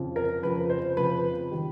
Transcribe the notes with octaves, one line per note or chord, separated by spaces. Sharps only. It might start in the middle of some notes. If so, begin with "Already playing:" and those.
Already playing: F2 C#3 F3
A#4
F2 C#3 F3 B4
C5
F2 C#3 F3 B4
D#3 G3